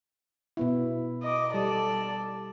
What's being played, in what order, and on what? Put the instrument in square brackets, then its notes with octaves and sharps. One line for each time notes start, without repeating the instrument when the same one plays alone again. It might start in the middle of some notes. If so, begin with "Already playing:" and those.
[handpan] B2 B3 E4
[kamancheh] D#5 D6
[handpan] G3 [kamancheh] A4 D5